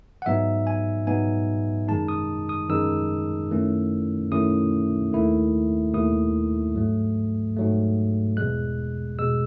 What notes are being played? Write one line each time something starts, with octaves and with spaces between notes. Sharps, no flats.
F#5
G#2 F#3 B3 D#4 E5
G#5
G#2 F#3 B3 D#4 G#5
F#2 D#3 G#3 D#4 A5
D#6
D#6
F#2 D#3 G#3 D#4 E6
F#2 D#3 A3 C#4 E4
F#2 D#3 A3 C#4 E4 D#6
D#2 D#3 A3 E4
D#2 D#3 A3 E4 D#6
G#2 F#3 A3
G#2 F#3 A3
E2 B2 G#3 F#6
B2 G#3 E6